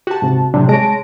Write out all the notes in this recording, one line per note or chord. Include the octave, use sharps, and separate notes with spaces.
F#4 G4 A5
G#2 C3
A2 C3 F#3 D4
G#3 C#5 A5 A#6 D7